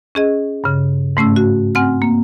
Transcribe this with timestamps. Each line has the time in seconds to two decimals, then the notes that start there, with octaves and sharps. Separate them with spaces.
0.15 C#4 G#4 D#5
0.64 G2 C#3
1.17 G#2 A3 C#4 E6
1.36 F#4
1.75 C4 F#5 G#5 F6
2.02 A#3